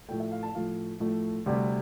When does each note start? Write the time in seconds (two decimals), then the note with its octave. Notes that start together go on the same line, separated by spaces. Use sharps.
0.08 A2 F3 A3 G5
0.20 E5
0.31 F5
0.43 A5
0.55 A2 F3 A3 F5
1.00 A2 F3 A3
1.46 D2 C3 G3